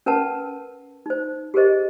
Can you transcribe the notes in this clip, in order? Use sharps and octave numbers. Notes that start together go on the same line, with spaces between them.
C#4 A#4 B4 F#5 A5
D#4 C5
G4 G#4 A#4 C5 D#5